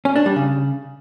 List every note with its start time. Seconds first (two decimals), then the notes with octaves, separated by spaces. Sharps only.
0.05 C#4
0.16 D4
0.26 G3
0.36 C#3